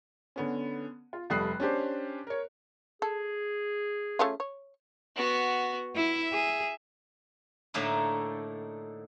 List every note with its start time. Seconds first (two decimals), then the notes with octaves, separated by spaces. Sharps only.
0.36 D3 B3 C#4
1.13 F4
1.30 F1 G3 A3 D#6 F#6 C7
1.60 C#4 D4 G4 C5
2.27 A#4 C#5
3.02 G#4 A4
4.19 A3 C#4 F4
4.40 C#5
5.16 B3 F#4
5.96 E4 E5
6.32 G#4
7.74 A2 D3 A3 A#3 D#4 E4